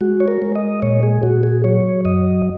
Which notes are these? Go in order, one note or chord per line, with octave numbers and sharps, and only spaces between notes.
G#3 F#4
C#5
A#4
G#3
D#5
A#2 C#5
G#4
A#2 F#4
G#4
F#3 C#5
F#2 D#5